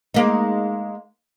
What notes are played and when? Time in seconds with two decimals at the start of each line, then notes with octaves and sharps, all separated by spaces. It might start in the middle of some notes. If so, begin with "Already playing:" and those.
0.14 G#3 A#3 D#4